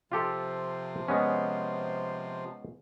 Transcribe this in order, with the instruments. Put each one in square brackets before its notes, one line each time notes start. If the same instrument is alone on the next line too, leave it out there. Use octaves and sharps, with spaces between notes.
[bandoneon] C3 F3 [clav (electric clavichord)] F4 G4 A4
[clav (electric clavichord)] G#3 B3 C#4